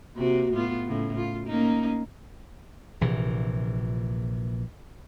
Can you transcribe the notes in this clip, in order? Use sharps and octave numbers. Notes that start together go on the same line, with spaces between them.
C3 A#3 F#4
A2 B3 F4
A2 C#3
F4
A#3 C#4 D#4
A#1 C3 E3